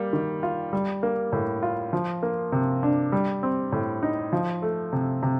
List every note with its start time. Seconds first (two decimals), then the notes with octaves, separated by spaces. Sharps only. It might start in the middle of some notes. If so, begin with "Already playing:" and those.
Already playing: G3 A#3
0.13 D#3
0.43 F4
0.73 G3
1.03 A#3
1.33 A2
1.63 F4
1.93 F3
2.23 A#3
2.52 C3
2.83 D4
3.12 G3
3.43 C4
3.72 A2
4.03 D#4
4.33 F3
4.62 A3
4.93 C3
5.23 C3